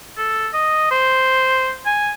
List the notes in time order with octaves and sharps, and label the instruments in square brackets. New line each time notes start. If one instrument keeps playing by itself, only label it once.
[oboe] A4
D#5
C5
G#5